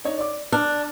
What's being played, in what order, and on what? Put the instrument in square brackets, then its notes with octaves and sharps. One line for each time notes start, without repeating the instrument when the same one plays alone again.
[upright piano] D4 D#4 C#5
D5 D6
[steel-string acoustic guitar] D4 [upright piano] F6